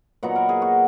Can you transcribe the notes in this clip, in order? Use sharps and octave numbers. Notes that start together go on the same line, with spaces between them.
A#2 F#3 B3 D#4 F#5
A#4
G#4
F#4